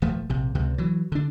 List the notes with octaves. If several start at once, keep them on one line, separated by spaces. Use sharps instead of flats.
D#1 F3 A3
A#1 C3
C#2 C3
E3 F#3
D3 D4